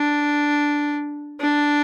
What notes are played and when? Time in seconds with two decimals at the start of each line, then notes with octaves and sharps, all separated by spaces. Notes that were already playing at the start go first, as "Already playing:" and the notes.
Already playing: D4
1.40 D4